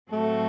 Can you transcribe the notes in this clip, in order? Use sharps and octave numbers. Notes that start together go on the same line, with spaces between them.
A2 F#3 A3 C4 F#4 A4